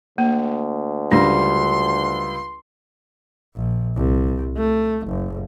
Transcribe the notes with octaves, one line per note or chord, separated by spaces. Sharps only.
D2 A#3
C#2 G3 D4 C6
A#1
C2
A3
F#1